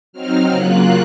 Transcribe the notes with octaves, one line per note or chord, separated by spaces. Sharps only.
F#3 C4 D#4 F6
C#3 F#3 A#3 F4 F#6